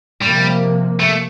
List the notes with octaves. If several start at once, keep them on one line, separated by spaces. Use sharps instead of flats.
C3 F3 G3 A#3
A3